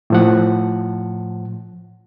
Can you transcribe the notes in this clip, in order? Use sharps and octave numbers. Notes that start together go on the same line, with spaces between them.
A2 F3 F#5